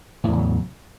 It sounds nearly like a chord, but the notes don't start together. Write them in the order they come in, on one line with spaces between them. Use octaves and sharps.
A2 E2 C#3 F#3